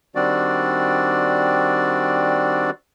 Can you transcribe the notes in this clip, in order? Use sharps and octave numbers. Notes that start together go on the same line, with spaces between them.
D#3 G3 C4 D4 F#4 D5